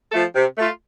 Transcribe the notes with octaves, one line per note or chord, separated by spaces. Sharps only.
F3 A3 F4 A4
C3
A3 F4